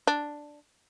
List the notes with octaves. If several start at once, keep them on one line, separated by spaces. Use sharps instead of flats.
D4